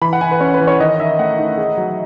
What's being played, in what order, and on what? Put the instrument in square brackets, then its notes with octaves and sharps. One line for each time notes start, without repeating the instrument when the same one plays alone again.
[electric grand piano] E3 [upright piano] B5
[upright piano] F#5
[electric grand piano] E3 [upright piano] G#5
[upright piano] B4
[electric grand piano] C#4 [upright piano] C#5
[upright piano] B4
[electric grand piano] E3
[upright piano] C#5
[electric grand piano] D#3 [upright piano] D#5
[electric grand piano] D#3 [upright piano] E5
[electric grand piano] A3 [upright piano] F#5
[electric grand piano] D#4
G#4
F#3